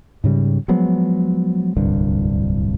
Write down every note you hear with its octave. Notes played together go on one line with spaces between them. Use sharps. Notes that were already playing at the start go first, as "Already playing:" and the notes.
G#2 C#3 G3
F3 F#3 G#3 B3
D1 C2 G2 D3